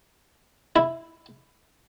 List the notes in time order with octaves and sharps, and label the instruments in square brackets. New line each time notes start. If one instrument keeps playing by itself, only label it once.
[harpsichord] E4